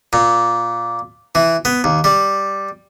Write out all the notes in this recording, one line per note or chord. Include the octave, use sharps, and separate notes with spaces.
A#2
E3
B3
D#2
G3